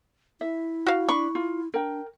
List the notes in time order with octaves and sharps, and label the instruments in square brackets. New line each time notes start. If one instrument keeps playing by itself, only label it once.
[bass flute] E4 [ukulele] E5
[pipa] F#4 F5
[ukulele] D4 B5 [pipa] C#6
[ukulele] F4
[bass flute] D4 [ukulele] A#4 G5